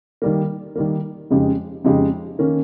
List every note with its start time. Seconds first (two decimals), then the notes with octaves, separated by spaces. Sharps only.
0.22 D#3 G3 A#3
0.76 D#3 G3 A#3
1.30 F2 C#3 G#3 D#4 G4
1.84 F2 C#3 G#3 D#4 G4
2.39 D#3 A#3 C#4